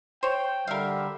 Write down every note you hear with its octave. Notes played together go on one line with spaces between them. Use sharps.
C5 C#5 G5
D3 G3 A#4 E5 F5